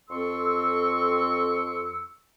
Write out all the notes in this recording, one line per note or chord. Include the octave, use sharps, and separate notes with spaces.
F2 C4 A4 C6 C#6 E6